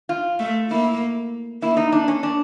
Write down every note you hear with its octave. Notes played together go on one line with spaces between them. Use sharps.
F4
A3
A#3 E4
A#3 E4
D#4
D4
C#4
D4